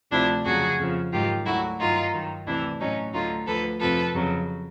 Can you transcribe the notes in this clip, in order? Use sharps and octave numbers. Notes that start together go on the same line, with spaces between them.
D2 C3 F3 D4 E4
F2 C#3 F#3 F#4 G#4
F2 C#3 F3
G#2 D#3 F#3 F4 G4
D2 D3 F#3 E4 F#4
G2 D#3 F#3 D#4 F4
G2 D#3 F#3
D2 C3 E3 D4 E4
A2 F#3 C#4 D#4
D2 D3 F#3 D#4 F4
D2 D3 F3 A4 B4
F2 C3 F3 A4 B4
F2 C#3 F#3